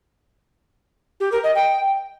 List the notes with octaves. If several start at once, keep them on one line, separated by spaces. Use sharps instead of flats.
G4
A#4
D#5
G5